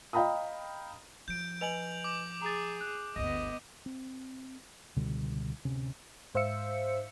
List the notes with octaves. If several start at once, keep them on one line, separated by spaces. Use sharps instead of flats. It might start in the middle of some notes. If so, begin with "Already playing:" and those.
D#5 F5 G5 A#5 B5 D#6
F3 G6 D7
B4 D#5 G#5 F7 F#7
D6
G#4 A#5 A6
F#6
G1 D2 B3 D#5 A#6
C4
C#2 B2 D3 G3
D1 C3 C#4
G#2 C5 E5 F5 E6 C#7